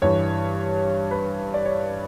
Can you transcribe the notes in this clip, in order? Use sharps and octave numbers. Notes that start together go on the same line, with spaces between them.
G2 E3 G3 C#5
B4
D5
C#5